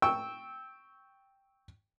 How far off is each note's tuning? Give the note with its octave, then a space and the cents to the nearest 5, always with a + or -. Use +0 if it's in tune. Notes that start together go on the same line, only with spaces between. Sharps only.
G5 +0 C#6 +0 E6 -15